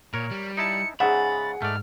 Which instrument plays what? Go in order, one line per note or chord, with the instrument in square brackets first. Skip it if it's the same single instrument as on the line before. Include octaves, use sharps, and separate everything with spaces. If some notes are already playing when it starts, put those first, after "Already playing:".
[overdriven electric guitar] A#2 [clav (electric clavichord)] A#4 C#5
[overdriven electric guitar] G3
[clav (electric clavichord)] D#4 E4 A5 [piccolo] C#7
[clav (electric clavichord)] G#2 C#3 E5 [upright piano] G#4 F#5 [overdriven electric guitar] B5 [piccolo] A6
[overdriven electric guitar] G#2 [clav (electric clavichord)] A3 D5 [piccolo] F6